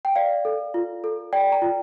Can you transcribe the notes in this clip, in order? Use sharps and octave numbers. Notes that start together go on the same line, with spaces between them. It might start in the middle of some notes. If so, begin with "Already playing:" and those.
G5
D5 F5
A4
F4
A4
D5 G5
A#5
F4